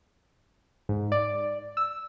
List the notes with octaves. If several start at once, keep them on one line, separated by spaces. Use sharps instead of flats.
G#2
D5
E6